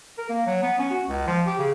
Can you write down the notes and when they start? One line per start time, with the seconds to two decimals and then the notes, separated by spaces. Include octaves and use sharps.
0.18 A#4
0.29 A#3
0.46 F#3
0.63 B3
0.79 C#4
0.91 F#4
1.08 C#2
1.27 F3
1.47 G4
1.59 C#3